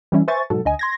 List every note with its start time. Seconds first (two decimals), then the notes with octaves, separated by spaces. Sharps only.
0.12 E3 G3 C#4 E4
0.28 B4 C5 E5 G#5 C#6 A6
0.50 G#2 B2 F#3 A4
0.65 D2 D#5 G#5
0.79 C6 G#6 A#6